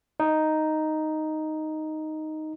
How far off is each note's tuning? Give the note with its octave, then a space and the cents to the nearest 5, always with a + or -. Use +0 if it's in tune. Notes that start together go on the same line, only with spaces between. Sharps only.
D#4 +0